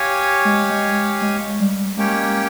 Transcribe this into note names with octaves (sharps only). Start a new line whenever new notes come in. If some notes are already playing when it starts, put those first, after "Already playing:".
Already playing: G4 C#5 F5 G#5
G#3
G#3
G#3
G3
G#3 A#3 C#4 G4 C#5 G5